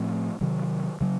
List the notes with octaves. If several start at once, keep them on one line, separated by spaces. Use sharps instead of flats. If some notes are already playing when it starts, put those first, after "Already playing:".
Already playing: A2 F3 A3 C4
C3 D#3 F#3
C#3 F#3